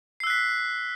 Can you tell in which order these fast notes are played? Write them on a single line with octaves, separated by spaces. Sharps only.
C7 E6 F#6 B6